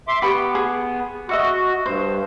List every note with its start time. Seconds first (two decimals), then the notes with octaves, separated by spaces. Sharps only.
0.08 E5 C6 D6
0.22 B3 G4 B5 C#6
0.55 G#4
1.29 F#4 D#5 E5 C#6
1.86 G2 C5